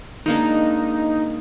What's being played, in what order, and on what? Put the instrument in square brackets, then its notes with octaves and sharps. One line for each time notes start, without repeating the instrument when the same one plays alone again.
[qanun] G#3 A#3 D4 [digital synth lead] D#4